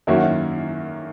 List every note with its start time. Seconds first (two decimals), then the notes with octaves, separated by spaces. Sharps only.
0.07 F#2 D#3 A#3 C#4 F#4 E5
0.15 F#5
0.24 E5